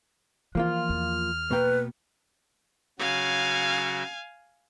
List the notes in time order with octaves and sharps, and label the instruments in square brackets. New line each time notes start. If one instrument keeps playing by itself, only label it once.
[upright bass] E3 [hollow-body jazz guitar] F3 A#3 F4 [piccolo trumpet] F6
[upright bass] E2
[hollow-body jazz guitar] B2 A#3 G5 [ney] B4
[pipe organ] C#3 F#3 F#4 [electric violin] F5 G#5